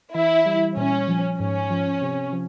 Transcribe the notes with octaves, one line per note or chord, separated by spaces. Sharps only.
E3 E4
G3
A#2 C#4
F3
G#2 C#4
F3
C3
F3